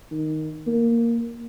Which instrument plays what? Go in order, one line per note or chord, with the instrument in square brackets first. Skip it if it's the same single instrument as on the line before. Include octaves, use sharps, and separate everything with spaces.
[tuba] D#3
A#3